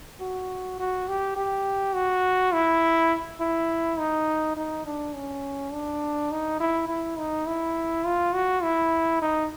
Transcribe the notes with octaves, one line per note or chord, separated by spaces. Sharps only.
F#4
F#4
G4
G4
F#4
E4
E4
D#4
D#4
D4
C#4
D4
D#4
E4
E4
D#4
E4
F4
F#4
E4
D#4